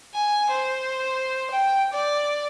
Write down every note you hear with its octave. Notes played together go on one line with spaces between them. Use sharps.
G#5
C5
G5
D5